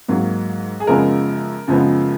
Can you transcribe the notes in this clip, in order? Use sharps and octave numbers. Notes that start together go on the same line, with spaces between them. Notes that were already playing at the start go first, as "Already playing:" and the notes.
G#2 F#3 A#3
G#4
F#2 C#3 F3 G#3 B3 A#4
F#2 C#3 F3 G#3 B3